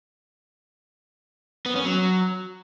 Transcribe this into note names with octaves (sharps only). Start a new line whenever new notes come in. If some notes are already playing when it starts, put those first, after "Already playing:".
B3
C#4
F#3